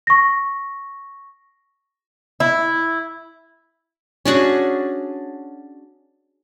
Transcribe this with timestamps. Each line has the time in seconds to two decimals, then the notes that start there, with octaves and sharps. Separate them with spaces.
0.07 C#6 A#6
2.40 E4
4.25 C#4 D4 F#4 G#4